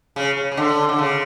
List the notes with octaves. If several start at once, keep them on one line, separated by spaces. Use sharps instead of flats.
C#3
C#3
C#3
D3
D3
C#3